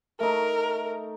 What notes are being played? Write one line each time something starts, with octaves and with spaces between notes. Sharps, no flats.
A3 D#4 A#4